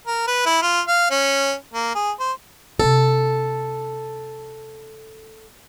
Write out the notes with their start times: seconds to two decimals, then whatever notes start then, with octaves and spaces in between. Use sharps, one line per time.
0.07 A#4
0.27 B4
0.46 E4
0.62 F4
0.88 F5
1.11 C#4
1.74 A#3
1.95 G#4
2.20 C5
2.80 C3 D4 A4